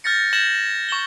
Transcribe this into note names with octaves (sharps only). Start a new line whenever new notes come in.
F6 G6 A6 A#6 C#7
F6 G6 G#6 A#6 E7 F#7
C#6 F#7 G7